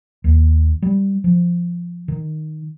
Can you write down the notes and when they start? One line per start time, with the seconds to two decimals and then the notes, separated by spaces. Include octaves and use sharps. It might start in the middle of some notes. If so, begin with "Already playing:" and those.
0.24 D#2
0.82 G3
1.24 F3
2.08 D#3